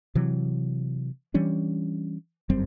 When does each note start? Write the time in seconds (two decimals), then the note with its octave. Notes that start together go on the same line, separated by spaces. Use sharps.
0.15 C3 E3 F#3
1.34 E3 G3 C#4 D4
2.50 G1 F#2 G3 C4